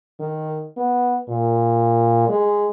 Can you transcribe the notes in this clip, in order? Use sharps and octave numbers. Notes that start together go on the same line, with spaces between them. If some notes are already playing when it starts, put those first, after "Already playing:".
D#3
B3
A#2
G#3